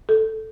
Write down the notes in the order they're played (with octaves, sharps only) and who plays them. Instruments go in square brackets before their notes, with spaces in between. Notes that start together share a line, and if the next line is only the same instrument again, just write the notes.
[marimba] A4